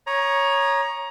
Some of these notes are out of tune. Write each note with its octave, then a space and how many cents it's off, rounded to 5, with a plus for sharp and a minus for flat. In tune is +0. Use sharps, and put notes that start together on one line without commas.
C#5 +0 A#5 +20 D#6 -30